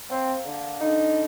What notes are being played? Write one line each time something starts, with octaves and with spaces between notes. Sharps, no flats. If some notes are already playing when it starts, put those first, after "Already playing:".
A#3 C4
D3
D3 D#4